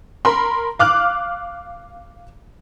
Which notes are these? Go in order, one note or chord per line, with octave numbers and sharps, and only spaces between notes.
A#4 B5 C6
F5 D6 F6 F#6